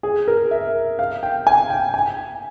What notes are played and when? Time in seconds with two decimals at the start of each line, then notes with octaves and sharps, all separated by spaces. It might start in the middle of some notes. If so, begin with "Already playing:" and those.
0.03 G#4
0.28 A#4
0.51 E5
0.99 F5
1.23 G5
1.47 G#5
1.70 G5
1.94 G#5